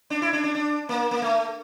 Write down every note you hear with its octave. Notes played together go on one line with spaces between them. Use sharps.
D4
E4
D4
D4
D4
A#3
A#3
A3